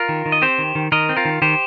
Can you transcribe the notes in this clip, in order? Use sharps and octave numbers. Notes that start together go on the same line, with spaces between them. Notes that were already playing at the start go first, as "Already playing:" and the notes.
Already playing: F4 A#4
D#3
D#3
D#5
C4 G4 C5
D#3
D#3
D#3 A#4 D#5
C4
F4 A#4
D#3
D#3 G4 C5